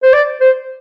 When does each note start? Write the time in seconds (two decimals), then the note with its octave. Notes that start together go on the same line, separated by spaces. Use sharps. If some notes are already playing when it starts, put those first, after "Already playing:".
0.03 C5
0.13 D5
0.41 C5